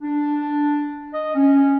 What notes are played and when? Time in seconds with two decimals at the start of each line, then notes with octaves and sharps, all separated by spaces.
0.01 D4
1.12 D#5
1.35 C#4